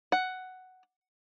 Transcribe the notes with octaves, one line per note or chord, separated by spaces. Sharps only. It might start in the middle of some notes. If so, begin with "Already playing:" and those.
F#5